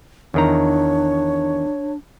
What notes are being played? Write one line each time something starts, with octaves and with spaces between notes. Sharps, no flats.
E2 D#3 D4 C#5 A#5